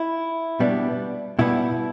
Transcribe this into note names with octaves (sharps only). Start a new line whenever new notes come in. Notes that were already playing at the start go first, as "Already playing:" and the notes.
Already playing: E4
B2 G3 B3 D4
B2 G3 B3 E4